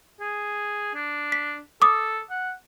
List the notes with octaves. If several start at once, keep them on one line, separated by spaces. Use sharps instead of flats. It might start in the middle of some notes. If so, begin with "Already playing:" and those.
G#4
D4
B6
A4 D6 D#6
F#5